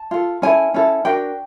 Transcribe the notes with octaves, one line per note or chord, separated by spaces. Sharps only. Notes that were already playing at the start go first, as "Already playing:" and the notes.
Already playing: A5
F4 A4
C#4 E4 A4 G#5
C#4 E4 A4
D4 F#4 A#4 G5